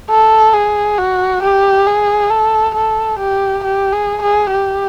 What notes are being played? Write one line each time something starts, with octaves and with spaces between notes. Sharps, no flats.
A4
G#4
F#4
G4
G#4
A4
A4
G4
G4
G#4
G#4
G4